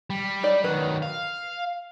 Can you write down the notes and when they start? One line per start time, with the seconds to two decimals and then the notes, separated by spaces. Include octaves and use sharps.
0.10 G3
0.43 D#4 D5
0.64 D#3 F#3 B4
1.02 F5